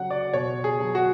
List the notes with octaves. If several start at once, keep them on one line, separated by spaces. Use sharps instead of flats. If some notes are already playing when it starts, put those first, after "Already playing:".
Already playing: C#3 F#3 F#5
D5
B2 C#5
G#4
F#3
F#4